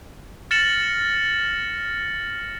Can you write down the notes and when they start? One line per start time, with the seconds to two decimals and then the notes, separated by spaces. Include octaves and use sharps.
0.51 F6 A6 A#6 C#7 E7 F#7